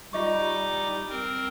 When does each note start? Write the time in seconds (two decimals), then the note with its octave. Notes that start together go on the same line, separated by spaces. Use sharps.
0.13 G3 D#4 F4 D#5 C#6 D6
1.10 C4 A#4